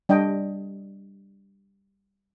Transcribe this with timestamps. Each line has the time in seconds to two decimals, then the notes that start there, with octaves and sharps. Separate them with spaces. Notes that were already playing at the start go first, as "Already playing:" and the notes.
0.09 G3 D4 D#5 G5